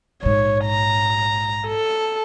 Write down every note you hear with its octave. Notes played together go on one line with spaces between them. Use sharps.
A#1 G#2 C#5
A#5
A4